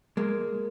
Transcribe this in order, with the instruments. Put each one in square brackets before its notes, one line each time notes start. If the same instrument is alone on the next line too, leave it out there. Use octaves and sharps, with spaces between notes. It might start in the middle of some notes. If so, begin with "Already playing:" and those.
[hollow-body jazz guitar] G#3 A#3